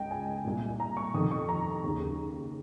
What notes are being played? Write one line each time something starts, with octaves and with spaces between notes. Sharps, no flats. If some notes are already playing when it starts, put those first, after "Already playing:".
Already playing: C#2 C#3 D#5 G5
G#5
C2 A#2
A#5
C#6
F2 C3 D#3 D#6
C#6
A#5
D#2 C#3